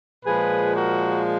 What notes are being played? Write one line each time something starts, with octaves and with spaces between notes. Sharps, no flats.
A#2 F3 G#3 G#4 B4
F#4 A#4